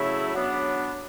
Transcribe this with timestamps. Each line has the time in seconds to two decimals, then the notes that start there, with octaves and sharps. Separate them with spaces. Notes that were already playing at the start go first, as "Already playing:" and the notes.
Already playing: C#3 F#3 A3 E4
0.35 F#3 B3 D4